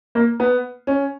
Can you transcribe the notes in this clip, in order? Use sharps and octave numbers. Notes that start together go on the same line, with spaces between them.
A#3
B3
C#4